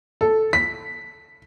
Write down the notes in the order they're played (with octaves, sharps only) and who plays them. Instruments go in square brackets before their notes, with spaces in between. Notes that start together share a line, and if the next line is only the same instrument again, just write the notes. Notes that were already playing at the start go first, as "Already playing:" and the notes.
[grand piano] A4
B6